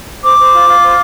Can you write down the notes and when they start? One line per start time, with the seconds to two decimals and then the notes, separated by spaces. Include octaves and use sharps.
0.22 C5 D6
0.38 C5
0.53 F4
0.68 F4
0.82 C5